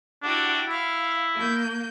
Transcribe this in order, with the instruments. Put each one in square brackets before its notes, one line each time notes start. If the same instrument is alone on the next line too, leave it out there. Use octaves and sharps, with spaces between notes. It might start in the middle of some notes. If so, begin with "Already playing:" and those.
[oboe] D4 [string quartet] E4 F#4 G4
[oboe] E4 [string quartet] F5
[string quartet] A#3 G6